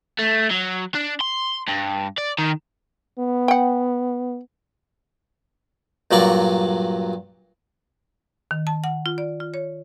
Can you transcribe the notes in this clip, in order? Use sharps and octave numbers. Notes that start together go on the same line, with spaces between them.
A3
F#3
D4
C6
G2
D5
D#3
B3
F#5 G5
G2 A#2 F#3 D5 C#6
D#3
A5
F#5
F4
D5
F4
C#5